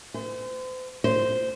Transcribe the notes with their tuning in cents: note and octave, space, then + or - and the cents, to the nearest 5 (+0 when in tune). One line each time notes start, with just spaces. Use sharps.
C5 -40
C5 -10